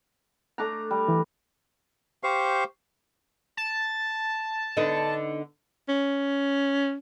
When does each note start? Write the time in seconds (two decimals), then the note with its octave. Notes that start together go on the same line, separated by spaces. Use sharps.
0.58 A3 D4 A#5
0.91 G3
1.08 E3
2.23 G4 C5 F5 C#6
3.57 A5
4.77 D3 B3 D#4
5.89 C#4